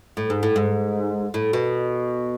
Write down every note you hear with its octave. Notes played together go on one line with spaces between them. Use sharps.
A2
G#2
A2
G#2
A2
B2